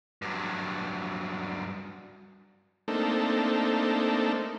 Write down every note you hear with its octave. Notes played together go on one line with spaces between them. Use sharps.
G2 F#3
A3 A#3 C4 D4 D#4 A4